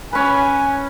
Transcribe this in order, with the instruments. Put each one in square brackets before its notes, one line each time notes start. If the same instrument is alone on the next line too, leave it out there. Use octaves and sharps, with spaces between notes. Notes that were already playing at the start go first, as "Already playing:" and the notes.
[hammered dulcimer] C#4 B4 [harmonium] G#5